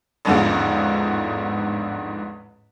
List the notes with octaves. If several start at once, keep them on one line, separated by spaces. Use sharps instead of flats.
A1 E2 G#2 D3 F3